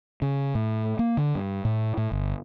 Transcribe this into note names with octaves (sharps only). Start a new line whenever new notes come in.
C#3
A2
A#3
D3
G2
A2
A2
G1